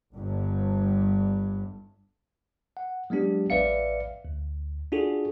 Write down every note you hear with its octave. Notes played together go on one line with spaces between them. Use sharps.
G1 G2
F#5
F#3 G#3 B3 D4 G4
A1 B4 D5 E5 F5 C#7
D2
D4 F4 F#4 G#4 A4